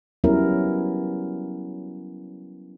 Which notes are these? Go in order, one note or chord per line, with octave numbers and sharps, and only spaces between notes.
F#3 G3 B3 C#4 E4 A#4